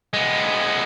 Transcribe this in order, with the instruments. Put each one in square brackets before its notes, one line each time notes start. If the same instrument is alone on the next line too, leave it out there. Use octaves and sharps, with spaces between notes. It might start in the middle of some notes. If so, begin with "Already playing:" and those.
[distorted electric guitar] G#3 B3